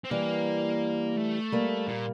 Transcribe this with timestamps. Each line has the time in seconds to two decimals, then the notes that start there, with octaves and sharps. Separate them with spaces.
0.05 C4
0.11 E3 G3 A#3
1.17 A3
1.52 G3 A#3
1.88 A#2